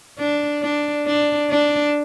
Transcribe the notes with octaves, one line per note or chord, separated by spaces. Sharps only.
D4
D4
D4
D4